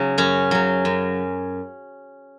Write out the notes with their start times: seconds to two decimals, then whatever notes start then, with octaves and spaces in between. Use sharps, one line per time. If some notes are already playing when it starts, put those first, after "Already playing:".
Already playing: C#3 F#3
0.18 F#2 C#4
0.51 C#3 F#3
0.85 F#2